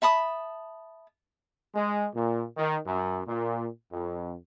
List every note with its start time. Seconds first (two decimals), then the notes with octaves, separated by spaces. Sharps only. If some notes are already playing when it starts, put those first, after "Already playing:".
0.02 E5 A5 B5 D#6
1.75 G#3
2.15 A#2
2.57 D#3
2.86 F#2
3.27 A#2
3.92 F2